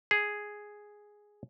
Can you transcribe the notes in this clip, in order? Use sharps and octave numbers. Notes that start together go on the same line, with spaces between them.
G#4